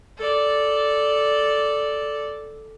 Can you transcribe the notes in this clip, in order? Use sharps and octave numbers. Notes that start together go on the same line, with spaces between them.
A4 D5